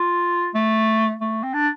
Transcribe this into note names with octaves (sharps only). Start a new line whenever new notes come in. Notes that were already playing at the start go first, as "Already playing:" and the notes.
Already playing: F4
A3
A3
C4
D4